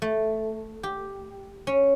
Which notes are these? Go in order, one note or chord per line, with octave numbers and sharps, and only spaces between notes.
A3
G4
C#4